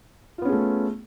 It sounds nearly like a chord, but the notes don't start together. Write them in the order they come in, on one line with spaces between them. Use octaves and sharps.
F4 B3 C#4 G#4 A3